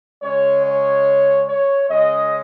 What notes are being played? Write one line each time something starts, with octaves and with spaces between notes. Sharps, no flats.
C#3 G#3 C#4 C#5
C#5
C#5
C#3 G#3 C#4 D#5